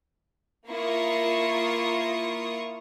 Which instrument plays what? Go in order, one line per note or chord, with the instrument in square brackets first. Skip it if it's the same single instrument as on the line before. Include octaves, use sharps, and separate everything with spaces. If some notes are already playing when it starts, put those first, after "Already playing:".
[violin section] A#3 E4 F4 A#4 C#6 D#6